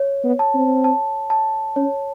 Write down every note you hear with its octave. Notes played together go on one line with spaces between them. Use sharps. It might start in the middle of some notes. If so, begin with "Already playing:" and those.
Already playing: C#5
B3
A5
C4
A5
A5
C#4 C#5